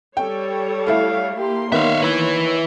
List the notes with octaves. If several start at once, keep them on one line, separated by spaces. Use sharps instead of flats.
G3 A4 C#5 G5
A3 E4 E5 F5
A#3 G4 C6
D#3 B3 C#5 E5 F5
E4 B4